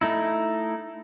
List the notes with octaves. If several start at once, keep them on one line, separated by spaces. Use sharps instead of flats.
A3 D#4 E4